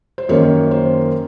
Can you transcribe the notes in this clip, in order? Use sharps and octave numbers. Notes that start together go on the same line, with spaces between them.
C5
F#2 D#3 A#3 C#4 C#5
C5